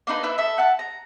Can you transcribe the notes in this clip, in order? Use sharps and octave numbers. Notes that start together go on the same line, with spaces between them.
A#3 D4 D#4 B4
E4 B4 E5 E6
A4 E5
F#5 A5
A#5